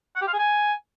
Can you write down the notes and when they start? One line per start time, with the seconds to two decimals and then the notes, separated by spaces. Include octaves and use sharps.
0.16 F#5
0.22 G4
0.27 F5
0.33 G#4
0.39 G#5